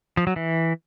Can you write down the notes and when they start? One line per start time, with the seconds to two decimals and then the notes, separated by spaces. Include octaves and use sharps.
0.17 F3
0.27 F#3
0.36 E3